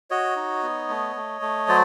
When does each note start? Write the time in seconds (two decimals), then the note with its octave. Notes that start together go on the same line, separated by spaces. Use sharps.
0.10 F#4 C#5 D#5
0.36 D#4
0.63 B3
0.89 A3
1.16 A3
1.42 A3
1.68 F#3 C5 D5